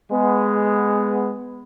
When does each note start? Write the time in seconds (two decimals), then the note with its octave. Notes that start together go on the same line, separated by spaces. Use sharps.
0.11 G#3 B3